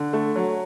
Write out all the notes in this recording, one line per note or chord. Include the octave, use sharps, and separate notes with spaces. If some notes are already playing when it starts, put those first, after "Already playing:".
Already playing: D3
A3
F#3